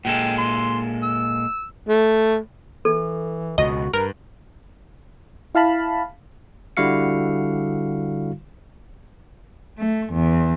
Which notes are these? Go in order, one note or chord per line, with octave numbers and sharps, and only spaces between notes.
A#2 G#3 A4 G5
C6
E6
A3
E3 A4
C#2 B2 F#4 D#5
G2 A#4 B4
E4 F5 A5 B5
D3 G3 E4 F#4 F5 C#7
A3
E2